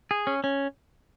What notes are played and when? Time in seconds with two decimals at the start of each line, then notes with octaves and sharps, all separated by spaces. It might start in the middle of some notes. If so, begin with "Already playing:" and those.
0.11 G#4
0.27 C#4
0.44 C#4